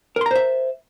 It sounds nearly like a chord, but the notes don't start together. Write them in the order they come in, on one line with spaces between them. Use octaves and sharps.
A#4 C6 A#5 C5 E5